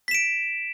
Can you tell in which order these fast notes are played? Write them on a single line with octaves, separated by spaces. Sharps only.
B6 E7 D7